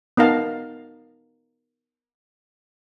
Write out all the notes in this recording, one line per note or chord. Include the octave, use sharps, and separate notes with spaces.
B3 D#4 A#4 F5 A5